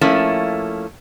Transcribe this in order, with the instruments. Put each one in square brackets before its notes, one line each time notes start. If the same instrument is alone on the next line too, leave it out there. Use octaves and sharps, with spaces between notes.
[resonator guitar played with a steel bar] F3 A3 A#3 C#4 E4